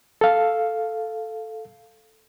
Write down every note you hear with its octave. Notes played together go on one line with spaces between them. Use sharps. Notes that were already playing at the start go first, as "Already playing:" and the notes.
A4 F5